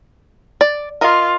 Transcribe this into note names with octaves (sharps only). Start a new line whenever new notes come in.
D5
F4 A#4 D#5